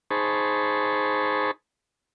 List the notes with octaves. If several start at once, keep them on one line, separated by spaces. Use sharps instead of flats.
D#4 G#4 C5 A5 B5 C#6